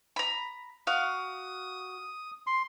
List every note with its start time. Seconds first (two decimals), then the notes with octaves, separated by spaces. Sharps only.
0.16 A#5 B5
0.87 F#4 F5 D#6
2.47 C6